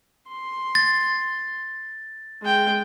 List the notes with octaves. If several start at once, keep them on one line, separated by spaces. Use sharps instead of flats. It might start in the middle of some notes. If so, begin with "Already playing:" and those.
C6
A6
G#3 G5